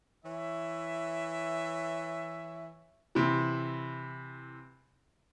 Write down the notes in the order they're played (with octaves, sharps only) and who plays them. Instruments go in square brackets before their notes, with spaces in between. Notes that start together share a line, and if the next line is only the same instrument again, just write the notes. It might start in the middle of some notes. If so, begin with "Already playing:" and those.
[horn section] E3 C#5 E5
[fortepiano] C3 E3